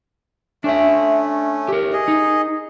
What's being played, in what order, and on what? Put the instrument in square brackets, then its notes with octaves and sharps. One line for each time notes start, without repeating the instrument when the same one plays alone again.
[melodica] A3 C#4 [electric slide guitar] D4 E5
[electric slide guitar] G4 A#4
[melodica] G#4 D#5
[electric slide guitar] D#4